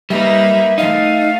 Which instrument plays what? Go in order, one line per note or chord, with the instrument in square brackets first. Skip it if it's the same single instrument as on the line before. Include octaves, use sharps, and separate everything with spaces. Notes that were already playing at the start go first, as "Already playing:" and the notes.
[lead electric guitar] G3 [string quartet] A#3 D#4 B4 [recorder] E5
[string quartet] A3 [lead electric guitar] D#4 [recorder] F5